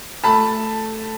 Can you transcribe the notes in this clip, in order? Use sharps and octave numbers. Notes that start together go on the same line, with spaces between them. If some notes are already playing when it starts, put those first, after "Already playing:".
A3 A5 B5